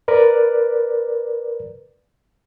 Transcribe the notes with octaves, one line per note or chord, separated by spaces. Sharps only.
A#4 B4 D5